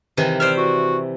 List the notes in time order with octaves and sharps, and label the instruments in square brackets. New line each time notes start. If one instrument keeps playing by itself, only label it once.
[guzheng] C3 D#3 E3
[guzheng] C5 D5 E5 [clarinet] F6
[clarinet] F#4